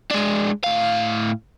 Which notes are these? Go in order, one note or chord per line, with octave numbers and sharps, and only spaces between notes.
G#3 D4
A2 F5